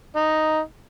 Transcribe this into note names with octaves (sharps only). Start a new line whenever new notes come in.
D#4